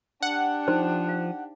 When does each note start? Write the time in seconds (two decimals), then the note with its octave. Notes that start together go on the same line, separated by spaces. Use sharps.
0.22 D4 G4 F#5
0.68 F3 D#4 C5
1.09 F5